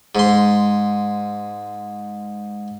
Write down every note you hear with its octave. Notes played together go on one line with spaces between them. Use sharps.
G#2 C6